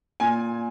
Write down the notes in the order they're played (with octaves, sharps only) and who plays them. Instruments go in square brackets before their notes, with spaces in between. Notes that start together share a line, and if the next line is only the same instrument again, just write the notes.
[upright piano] A#2 G#5